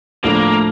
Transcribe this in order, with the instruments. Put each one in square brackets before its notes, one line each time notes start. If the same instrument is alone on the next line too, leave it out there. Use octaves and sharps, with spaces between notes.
[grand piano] A2 F3 A3 D4 [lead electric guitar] A#3